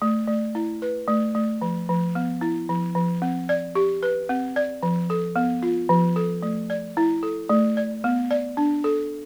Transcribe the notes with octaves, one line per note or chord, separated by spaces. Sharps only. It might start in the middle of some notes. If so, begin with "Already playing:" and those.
A3
A3
E4
B4
A3
A3
F3
F3
B3
E4
F3
F3
C4
D5
G4
B4
C4
D5
F3
A4
B3
F4
F3
A4
A3
D5
E4
A4
A3
D5
B3
D5
D4
A4